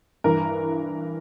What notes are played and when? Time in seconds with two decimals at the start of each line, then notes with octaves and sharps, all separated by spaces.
0.24 G2 E3 A#4